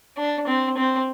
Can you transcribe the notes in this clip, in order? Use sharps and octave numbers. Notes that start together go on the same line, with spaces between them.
D4
C4
C4